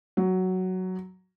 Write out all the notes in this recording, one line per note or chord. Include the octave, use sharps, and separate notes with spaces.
F#3